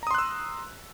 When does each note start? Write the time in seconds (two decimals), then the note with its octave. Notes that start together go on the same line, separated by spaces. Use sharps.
0.03 A#5
0.07 D#6
0.11 C6
0.15 F#6
0.18 E6